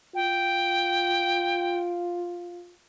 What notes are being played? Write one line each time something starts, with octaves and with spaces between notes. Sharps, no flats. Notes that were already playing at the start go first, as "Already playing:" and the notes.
F4 G5